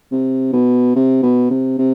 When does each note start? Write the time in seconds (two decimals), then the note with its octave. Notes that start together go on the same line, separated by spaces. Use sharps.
0.12 C3
0.53 B2
0.95 C3
1.22 B2
1.50 C3
1.79 C3